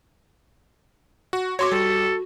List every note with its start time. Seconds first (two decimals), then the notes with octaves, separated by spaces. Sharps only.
1.33 F#4
1.59 F#4 C#5 C6 D6
1.72 G3 A4